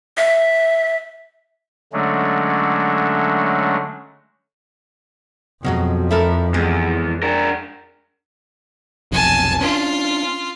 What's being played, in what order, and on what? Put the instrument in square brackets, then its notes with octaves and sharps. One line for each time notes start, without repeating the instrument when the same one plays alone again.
[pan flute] E5
[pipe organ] D3 F#3 G#3 A3 C#4 D4
[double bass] F2 [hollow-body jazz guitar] B2 F#3 G#3
[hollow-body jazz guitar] E4 A4 A#4
[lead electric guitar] E2 [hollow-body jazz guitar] G#3
[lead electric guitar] D4 A#4
[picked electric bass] F1 B1 F2 [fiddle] G#5 A5
[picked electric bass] C#4 D4 [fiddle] F4